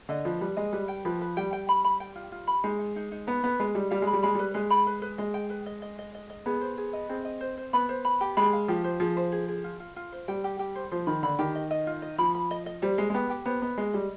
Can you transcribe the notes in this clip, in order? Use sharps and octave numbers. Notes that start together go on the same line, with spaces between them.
D3 D#5
F3 B4
G3 B4
G#3 D#5
G3 B4
G5
F3 B4
B4
G3 G5
G5
B5
B5
G5
F4
F4
B5
G#3 D#4
D#4
D#4
D#4
B3 B4
B3 B4
G#3 B4
G3 D#4
G3 F5
G#3 B5
G3
G#3 B5
G3 B4
G#3 B4
B5
B4
B4
G#3 D#5
G5
B4
D#5
D#5
D#5
D#5
D#5
B3 G#4
C5
G#4
D#5
C4 G#4
D#5
C5
C5
B3 B5
C5
B5
G4
G#3 B5
F5
F3 G4
C5
F3 G#4
C5
G#4
G#4
F4
F4
F4
C5
G3 G5
G4
G4
C5
F3 C5
D#3 B5
D3 B5
D#3 G4
D#5
D#5
F4
D#5
F3 B5
B5
D#5
D#5
G3 C5
G#3 D#5
G#3
B3 G4
G4
B3 C5
B3 D#5
G#3 D#5
G3 D#5